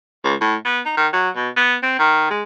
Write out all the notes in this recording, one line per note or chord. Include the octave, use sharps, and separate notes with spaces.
C#2
A2
B3
D#4
D#3
F#3
B2
B3
C4
D#3
G#3